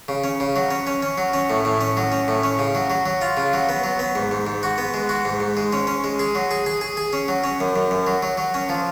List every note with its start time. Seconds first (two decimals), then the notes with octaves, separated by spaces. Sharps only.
0.08 C#3
0.24 C#4
0.40 C#3
0.56 F#3
0.71 C#4
0.87 C#4
1.03 C#4
1.18 F#3
1.33 C#4
1.50 A2
1.65 A2
1.81 C#4
1.97 F#3
2.12 C#4
2.28 A2
2.44 C#4
2.59 C#3
2.75 F#3
2.90 F#3
3.06 F#3
3.21 F4
3.37 C#3
3.53 F#3
3.69 B3
3.84 F#3
3.99 B3
4.15 G#2
4.31 G#2
4.47 G#2
4.63 F#4
4.78 B3
4.94 G#3
5.09 F#4
5.25 G#2
5.40 G#2
5.57 G#3
5.73 C#4
5.87 C#4
6.04 G#3
6.19 G#4
6.35 F#3
6.51 G#4
6.66 G#4
6.81 G#4
6.97 G#4
7.13 C#4
7.28 F#3
7.44 C#4
7.60 F#2
7.76 F#2
7.91 F#2
8.07 F#3
8.22 F#3
8.38 F#3
8.54 C#4
8.69 F3